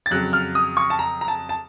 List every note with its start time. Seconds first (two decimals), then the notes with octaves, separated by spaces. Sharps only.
0.06 A6
0.11 F2 C#3 F#3 F#6
0.33 F6
0.55 D#6
0.77 C#6
0.90 A5
0.99 A#5
1.21 A#5
1.28 A5
1.49 A5